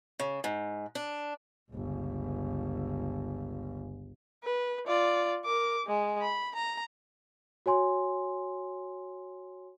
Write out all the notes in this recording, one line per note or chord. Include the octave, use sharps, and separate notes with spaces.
C#3
G#2
D4
G1 C#2
B4
F4 D5
A#4 D6
G#3
B5
A#5
F#4 C#5 G#5 C6